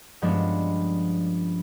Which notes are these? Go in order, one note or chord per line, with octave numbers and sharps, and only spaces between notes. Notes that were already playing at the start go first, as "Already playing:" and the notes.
G2 F3 G#3 B3 C#4 D4